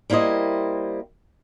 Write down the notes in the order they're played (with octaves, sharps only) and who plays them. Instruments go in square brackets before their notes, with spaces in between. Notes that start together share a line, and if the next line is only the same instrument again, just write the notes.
[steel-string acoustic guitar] G3 A#3 E4 C5 D#5